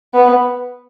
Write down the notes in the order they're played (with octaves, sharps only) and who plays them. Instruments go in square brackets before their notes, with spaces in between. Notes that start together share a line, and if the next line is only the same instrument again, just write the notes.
[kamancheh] B3